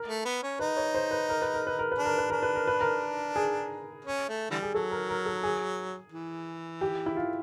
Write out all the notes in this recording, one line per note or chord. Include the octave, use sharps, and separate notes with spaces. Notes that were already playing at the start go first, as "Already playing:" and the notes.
Already playing: A#4
A3
B3
C#4
D#4 B4
C#5
C5
B4
A#4
B4
A#4
B4
A#4
B4
D4
A#4
B4
D4 A#4
B4
A#4
B4
A#4
G#4
C#4
A3
D3 E3 G3
G#4
F#3 A4
A#4
A#4
A4
G#4
E3
G4
E4
F4